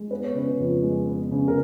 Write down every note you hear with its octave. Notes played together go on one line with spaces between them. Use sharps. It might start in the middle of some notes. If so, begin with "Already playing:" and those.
Already playing: G#3
B3 B4
C#5
C#3 B4
F2
G#3
B3
C#3
A#4